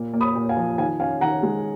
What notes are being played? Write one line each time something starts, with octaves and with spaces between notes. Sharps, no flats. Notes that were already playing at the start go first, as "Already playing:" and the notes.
Already playing: A#2 A#3
A#3
B5 D#6
A#2
F5 G#5
F3
D#3 F5 G#5
C#4 F5 G#5
D#3 F#5 A#5
G#3